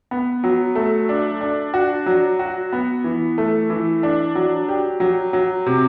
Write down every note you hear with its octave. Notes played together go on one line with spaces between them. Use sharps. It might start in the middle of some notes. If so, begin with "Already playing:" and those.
B3
F#3
A3
D4
D4
F#4
F#3
F#4
B3
E3
A3
E3
D4
F#3
G4
F#3
F#3
C3